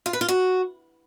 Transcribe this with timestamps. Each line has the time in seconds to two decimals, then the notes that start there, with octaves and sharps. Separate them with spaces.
0.06 F4
0.13 B4
0.21 F4
0.28 F#4